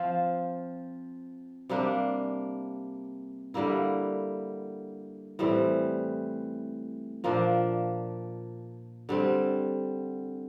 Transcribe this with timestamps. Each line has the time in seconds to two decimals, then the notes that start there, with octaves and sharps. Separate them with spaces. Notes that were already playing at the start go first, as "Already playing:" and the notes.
Already playing: F3 C4 F4
1.69 C3 G3 A#3 D4
3.54 D3 G3 A#3 E4
5.39 A2 E3 G3 C4
7.24 A#2 F3 A#3 D4
9.09 D3 G3 C4